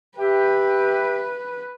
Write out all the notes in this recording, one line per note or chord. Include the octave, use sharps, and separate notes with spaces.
G4 B4 E5 G5